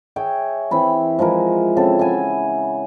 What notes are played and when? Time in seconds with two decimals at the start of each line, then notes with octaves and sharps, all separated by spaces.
0.16 G#4 C#5 E5 G5
0.71 E3 C4 E5 B5
1.19 F3 G#3 E4 A#4
1.76 C#3 C4 A4
1.99 E5 F#5 G#5 B5